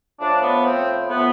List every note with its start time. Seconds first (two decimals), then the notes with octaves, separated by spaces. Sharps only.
0.19 A2 F3 D4
0.42 B3
0.65 C4
1.09 A2 F3 B3